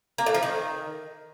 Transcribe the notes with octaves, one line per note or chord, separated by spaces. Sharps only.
A#3
A2
F3
D#3